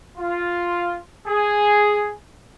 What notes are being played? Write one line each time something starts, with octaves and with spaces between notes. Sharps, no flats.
F4
G#4